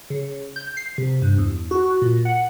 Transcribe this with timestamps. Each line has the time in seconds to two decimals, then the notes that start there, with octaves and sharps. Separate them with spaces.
0.10 C#3
0.56 G6
0.77 C7
0.98 C3
1.22 G2
1.38 E2
1.71 F#4
2.02 A#2
2.25 F#5